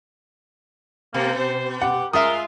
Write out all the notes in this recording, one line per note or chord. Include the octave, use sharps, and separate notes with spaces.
B2 A#3
C5
G4 F#5
G#3 F4 A#4 E5 D#6